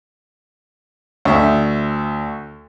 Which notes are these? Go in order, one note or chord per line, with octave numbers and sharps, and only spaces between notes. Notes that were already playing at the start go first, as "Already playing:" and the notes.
D2 E5